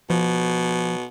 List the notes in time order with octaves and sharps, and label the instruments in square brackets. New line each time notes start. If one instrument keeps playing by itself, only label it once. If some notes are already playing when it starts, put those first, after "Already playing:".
[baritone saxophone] B2 [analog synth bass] F3